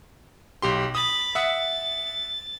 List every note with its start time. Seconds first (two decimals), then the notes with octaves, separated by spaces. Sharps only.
0.62 B1 G4 C6
0.95 B5 D#6 A6
1.35 E5 F#5 D#6 A6